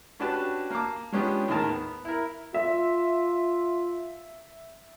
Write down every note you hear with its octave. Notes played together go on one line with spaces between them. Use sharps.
C#4 D4 F#4 G4 B4 A5
A#3 F5 A5 D6
G#3 B3 C#4 D4 F4 G4
D#2 A2 G#4 A#4 A5
B3
E4 A#4
F4 E5